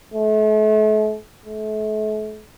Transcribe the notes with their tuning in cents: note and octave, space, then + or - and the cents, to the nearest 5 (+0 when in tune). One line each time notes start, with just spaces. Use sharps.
A3 -40
A3 -40